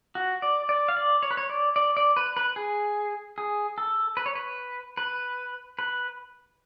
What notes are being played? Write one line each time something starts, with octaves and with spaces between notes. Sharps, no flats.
F#4
D5
D5
F5
D5
C#5
B4
C#5
D5
D5
D5
B4
B4
G#4
G#4
A4
B4
C#5
B4
B4
B4